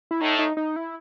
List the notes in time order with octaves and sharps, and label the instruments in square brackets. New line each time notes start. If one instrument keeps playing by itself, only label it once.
[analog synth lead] E4
[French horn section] A2 A3 [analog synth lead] D#4
[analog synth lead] D#4
D#4
E4